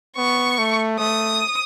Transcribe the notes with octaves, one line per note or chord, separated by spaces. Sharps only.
B3 C#6
A3
A3 D#6